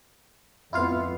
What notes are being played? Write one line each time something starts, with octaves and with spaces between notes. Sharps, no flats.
F2 B3 E4 F4 F5